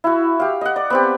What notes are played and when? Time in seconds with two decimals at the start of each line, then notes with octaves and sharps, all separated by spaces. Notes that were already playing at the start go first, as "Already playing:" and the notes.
0.04 E4 F#4
0.40 G4 F5
0.61 D#5 F#5
0.76 D5
0.90 B3 C4 G4